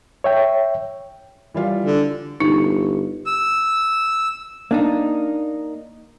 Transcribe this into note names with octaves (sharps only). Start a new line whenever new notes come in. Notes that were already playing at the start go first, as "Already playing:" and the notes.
C#5 E5 G5
E3 G3 F4
D3
G1 D#4
E6
A#3 D4 D#4